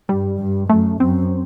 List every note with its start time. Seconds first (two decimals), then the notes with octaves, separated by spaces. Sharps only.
0.09 G2 G3
0.39 G2
0.69 F#2 A3
1.00 F#2 C4